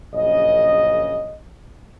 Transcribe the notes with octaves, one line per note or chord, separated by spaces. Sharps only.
A#1 F#2 C#3 D#5